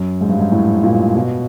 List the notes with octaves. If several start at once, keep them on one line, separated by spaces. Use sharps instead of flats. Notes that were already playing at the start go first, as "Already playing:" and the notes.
Already playing: F#2
G#2
G2
G#2
A2
A#2
B2